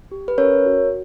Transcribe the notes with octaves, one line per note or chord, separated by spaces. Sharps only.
G4
B4
C#4 A#4 C#5
F#4